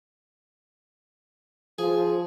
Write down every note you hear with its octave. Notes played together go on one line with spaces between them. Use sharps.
F3 G#4